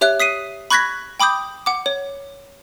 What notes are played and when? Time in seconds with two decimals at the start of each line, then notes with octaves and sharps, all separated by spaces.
0.01 G4 C#5 E5 F#6
0.20 D#6 B6 C7 D#7
0.70 B5 C#6 F#6 G#6 A#6 B6
1.20 G5 B5 D6 D#6 G6
1.66 F#5 D6
1.86 C#5